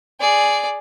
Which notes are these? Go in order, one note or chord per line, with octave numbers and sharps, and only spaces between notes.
G#4 D5